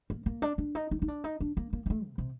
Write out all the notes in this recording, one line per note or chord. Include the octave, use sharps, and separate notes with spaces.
A#3
A#3
D4
D4
D#4
D#4
D#4
D4
D#4
D4
A#3
A#3
A#3
A3
C3
C3